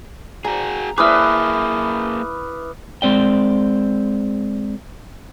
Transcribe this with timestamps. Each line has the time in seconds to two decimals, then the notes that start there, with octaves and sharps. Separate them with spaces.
0.45 F#4 G#4 A#5
0.98 A#3 E4 G#4 B4 D6 D#6 F6
3.02 G#3 C4 D5 G5